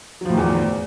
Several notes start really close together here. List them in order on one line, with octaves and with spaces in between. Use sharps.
F#3 F3 A2 D#3 E2